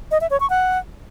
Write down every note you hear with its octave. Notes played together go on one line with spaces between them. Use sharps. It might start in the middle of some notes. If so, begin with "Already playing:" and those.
D#5
E5
C#5
C#6
F#5